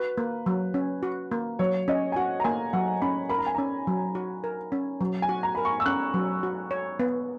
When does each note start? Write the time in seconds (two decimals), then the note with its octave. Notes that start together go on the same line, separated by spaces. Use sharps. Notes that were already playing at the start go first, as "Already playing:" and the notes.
Already playing: F#4 B4
0.18 A#3
0.46 F#3
0.74 C#4
1.03 F#4
1.31 A#3
1.59 F#3 C#5
1.88 C#4 D#5
2.12 G#5
2.16 F#4 F#5
2.40 A#5
2.44 A#3 G#5
2.73 F#3 F#5
3.02 C#4 B5
3.29 A#4 B5
3.38 A#5
3.47 G#5
3.55 C#4 A#5
3.87 F#3
4.15 F#4
4.44 A#4
4.72 C#4
5.01 F#3
5.22 G#5
5.29 F#4
5.43 A#5
5.55 A#4 B5
5.65 C#6
5.80 E6
5.86 C#4 F#6
6.14 F#3
6.43 F#4
6.71 C#5
6.99 B3